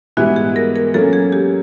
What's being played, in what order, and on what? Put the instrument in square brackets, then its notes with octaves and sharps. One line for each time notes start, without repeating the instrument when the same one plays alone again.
[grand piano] G#2 E3 G3 B3 E4 [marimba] F#4
[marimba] G#4
A#4
A#4
[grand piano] F#3 A#3 C#4 [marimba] A4
[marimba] G#4
G4